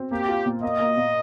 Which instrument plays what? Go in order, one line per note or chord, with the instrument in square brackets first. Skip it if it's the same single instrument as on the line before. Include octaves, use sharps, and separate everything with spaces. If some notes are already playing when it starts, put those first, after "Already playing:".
Already playing: [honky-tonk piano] C4
[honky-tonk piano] A#3 [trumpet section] G4
[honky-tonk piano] F4
A#2
[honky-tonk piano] A#3 [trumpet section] D#5
[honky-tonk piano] A#3
A#2